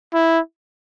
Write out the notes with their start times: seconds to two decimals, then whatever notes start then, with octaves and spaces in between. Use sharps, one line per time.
0.14 E4